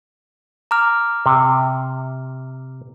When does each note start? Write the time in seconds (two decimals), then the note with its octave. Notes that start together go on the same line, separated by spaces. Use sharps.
0.71 A#5 D6 F6
1.26 C3